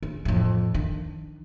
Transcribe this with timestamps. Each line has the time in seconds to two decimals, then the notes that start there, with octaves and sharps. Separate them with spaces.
0.02 C#3
0.25 F2 A2
0.74 D#3 D4